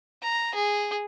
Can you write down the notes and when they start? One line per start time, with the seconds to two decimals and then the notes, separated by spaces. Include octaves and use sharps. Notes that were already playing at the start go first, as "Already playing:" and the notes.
0.22 A#5
0.55 G#4